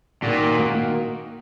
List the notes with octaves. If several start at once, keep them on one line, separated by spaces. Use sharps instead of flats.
A#2 D#3 A#3 F#4
D#3 A#3 F#4